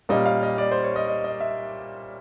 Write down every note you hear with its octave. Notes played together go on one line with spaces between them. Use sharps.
A#2 G3 A#3 C#4 D#5
F5
D#5
D5
C5
C#5
D#5
D#5
D#5
E5